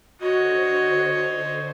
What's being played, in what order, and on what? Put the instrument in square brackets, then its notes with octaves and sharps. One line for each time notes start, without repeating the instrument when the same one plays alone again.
[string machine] D3 C5 [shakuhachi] F#4 [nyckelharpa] C#5 D#5